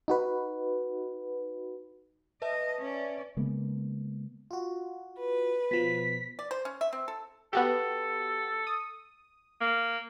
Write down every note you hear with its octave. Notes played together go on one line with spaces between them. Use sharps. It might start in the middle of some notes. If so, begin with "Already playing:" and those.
D#4 F#4 B4
B4 D#5 E5 A5
C#4 D5
C#3 G#3 A#3 B3
F4 F#4
B4
B2 F3 B6
D5
C5
C#4
E5
C4
A4
B3 F#4 G4 A4
D#6
A#3